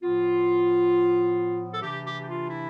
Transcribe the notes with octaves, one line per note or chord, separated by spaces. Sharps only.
A2 F3 B3 F4
A4
C3 E3 A3 D4 G4
G4
G4
F4
E4